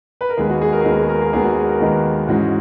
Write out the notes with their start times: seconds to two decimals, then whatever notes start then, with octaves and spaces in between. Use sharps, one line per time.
0.21 B4
0.29 A#4
0.37 D#2 D#3 G#3 B3 G#4
0.50 F#4
0.62 G#4
0.72 A#4
0.81 G#4
0.84 D#2 D#3 G#3 B3 F#4
0.97 G#4
1.09 A#4
1.21 G#4
1.33 D#2 D#3 G#3 B3 G#4
1.44 F#4
1.69 A#4
1.80 D#2 D#3 G#3 B3
2.28 G#2 E3 G#3 C#4 F#4